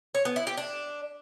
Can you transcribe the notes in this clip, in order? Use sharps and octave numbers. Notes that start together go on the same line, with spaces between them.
C#5
B3
E4
G4
D4